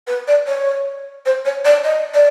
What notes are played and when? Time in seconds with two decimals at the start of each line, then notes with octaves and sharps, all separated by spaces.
0.07 B4
0.27 D5
0.47 C#5
1.25 C5
1.45 C#5
1.65 D5
1.84 D#5
2.14 D5